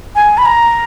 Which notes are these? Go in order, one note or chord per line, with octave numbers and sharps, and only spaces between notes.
G#5
B5
A#5